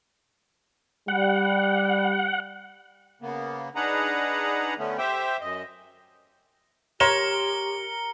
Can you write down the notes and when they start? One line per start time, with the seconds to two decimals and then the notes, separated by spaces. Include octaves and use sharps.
1.08 G3 F#5
3.22 C#3 A#3 B3
3.75 D4 D#4 G#4 B4 F#5 A#5
4.78 D3 A3 B3 C#4
4.98 G4 C5 E5 G5
5.41 F#2 D#5
7.00 G4 A#4 C#5 C6 C#7 E7 G7